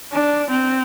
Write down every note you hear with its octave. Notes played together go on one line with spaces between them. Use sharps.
D4
C4